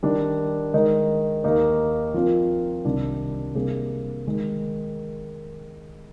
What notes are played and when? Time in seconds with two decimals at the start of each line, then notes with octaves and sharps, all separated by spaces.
0.03 D#3 G3 D4
0.74 D#3 G#3 D#4 A#4
1.44 D#2 D#3 A#3 D#4 A#4
2.14 F3 C4 F4 A#4
2.85 C2 C3 D#3 G3 D4
3.55 C3 G3 A#3 D4 G#4
4.27 D#3 G#3